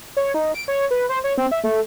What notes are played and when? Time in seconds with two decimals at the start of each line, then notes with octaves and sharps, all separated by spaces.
0.17 C#5
0.34 D#4
0.54 D7
0.68 C#5
0.91 B4
1.09 C5
1.24 C#5
1.38 C4
1.52 E5
1.64 A3